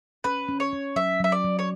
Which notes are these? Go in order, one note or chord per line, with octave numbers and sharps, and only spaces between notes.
C#4 B4
C#4
C#5
C#4
F#3 E5
F#3 E5
D5
F#3
C#5